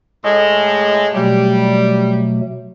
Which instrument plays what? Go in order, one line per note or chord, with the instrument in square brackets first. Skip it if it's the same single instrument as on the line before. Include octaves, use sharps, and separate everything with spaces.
[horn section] A2 G#3
[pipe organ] B2 F#3 A3 [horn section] G3